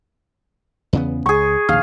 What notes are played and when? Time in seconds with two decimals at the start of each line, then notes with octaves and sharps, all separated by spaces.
0.93 E2 C#3 B3
1.26 C#2 G#4 C#6
1.69 A#1 D#2 F5